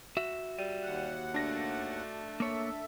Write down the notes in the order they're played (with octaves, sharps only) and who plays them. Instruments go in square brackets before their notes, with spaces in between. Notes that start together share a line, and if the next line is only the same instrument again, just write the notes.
[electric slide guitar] F#4 E5
[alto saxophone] G3 [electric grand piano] D#7
[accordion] D#2 F#5
[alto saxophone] A3 [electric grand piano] D4 A#6
[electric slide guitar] A#3 C#5 [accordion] A4 E5